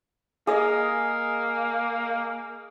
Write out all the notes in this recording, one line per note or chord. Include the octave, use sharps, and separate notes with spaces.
A#3 G#4 D#5